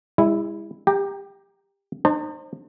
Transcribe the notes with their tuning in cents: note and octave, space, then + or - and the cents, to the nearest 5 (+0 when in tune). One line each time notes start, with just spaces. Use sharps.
G#3 -40 E4 +0
G4 +20 G5 +0 A#5 +0
D#4 -40 C5 +25 A5 +40